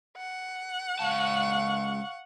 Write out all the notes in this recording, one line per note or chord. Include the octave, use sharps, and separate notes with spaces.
F#5
C#2 F5 A5 C#6